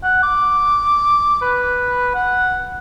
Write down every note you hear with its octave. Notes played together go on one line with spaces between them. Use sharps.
F#5
D6
B4
F#5